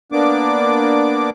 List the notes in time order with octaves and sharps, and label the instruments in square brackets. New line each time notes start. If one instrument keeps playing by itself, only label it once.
[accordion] A#3 B3 D4 D6